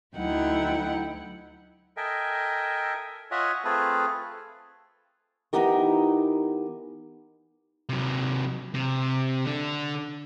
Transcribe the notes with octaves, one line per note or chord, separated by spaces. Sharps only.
D2 F#3 D#4 E4 F#5 G5
A4 A#4 D#5 E5 G5 G#5
F4 C#5 D#5 E5 F#5 G#5
A3 C4 F4 G#4 A4 B4
E3 G#3 B3 D#4 G4 A#4
C3 F#3
C3
D3 D4